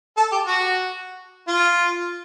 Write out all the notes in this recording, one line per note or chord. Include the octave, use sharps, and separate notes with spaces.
A4
G4
F#4
F4